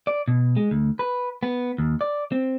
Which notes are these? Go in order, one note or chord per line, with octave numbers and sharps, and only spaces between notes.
D5
B2
G#3
D2
B4
B3
D#2
D5
C4